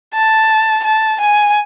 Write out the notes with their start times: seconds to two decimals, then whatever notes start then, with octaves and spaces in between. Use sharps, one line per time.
0.14 A5
0.84 A5
1.21 G#5